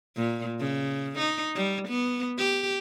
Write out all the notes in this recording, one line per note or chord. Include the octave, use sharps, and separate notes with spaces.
A#2
C#3
D#4
G3
B3
G4